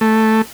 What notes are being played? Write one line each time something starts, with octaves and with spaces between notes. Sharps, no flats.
A3